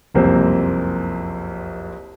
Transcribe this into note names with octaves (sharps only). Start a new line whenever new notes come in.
F#1 C2 F2 A#3 C4 C5